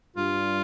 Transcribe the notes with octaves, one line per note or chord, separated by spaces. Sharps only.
G2 G3 F4